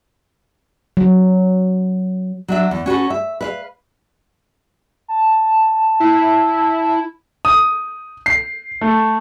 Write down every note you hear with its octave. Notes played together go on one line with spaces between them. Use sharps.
F#3
F#3 D4 E5
E2
C#4 F#4 A4 B4
E5
B4 E5 F5
A5
E4
D#6
C7
A3